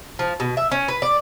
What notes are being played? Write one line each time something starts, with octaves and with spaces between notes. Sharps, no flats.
F3
B2
E5
C#4
B4
D5